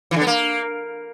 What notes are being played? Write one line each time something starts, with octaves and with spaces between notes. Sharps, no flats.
E3
D3
B3
A#3